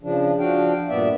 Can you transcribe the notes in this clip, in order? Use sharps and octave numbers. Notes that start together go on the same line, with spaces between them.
C#3 F3 D4
F3 D4 F#4 F5 G5
G2 A#2 B3 D5 E5